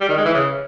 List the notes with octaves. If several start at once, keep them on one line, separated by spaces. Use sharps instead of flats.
G3
D#3
G#3
E3
C#3